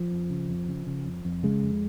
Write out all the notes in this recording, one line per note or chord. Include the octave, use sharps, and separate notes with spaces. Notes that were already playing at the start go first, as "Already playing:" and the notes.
Already playing: F3
F2
C#3
F2
C#3
C#3
F2
F2
C#3 G#3
F2